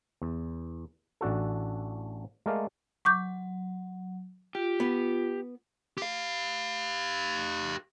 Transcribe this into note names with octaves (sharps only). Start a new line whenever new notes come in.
E2
A1 D4 F#4 A4
G#3 A3 A#4 D5 F5
F#3 C#6 D6 G6
F4 G4
B3
G4 F5